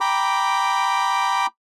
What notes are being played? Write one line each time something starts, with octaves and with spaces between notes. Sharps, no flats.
G5 A#5 B5 D6